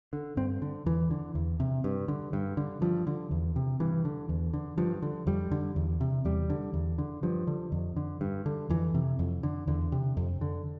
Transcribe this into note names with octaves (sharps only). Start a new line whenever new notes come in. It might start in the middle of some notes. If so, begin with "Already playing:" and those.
D3
G2 C4
D3
E2 E3
D3
E2
C3
G2
D3
G2
D3
G2 F3
D3
E2
C3
G2 E3
D3
E2
D3
G2 F3
D3
F2 G3
D3
E2
C3
E2 G3
D3
E2
D3
G2 F3
D3
F2
D3
G2
D3
F2 E3
C3
F2
D3
E2 D3
C3
F2
D3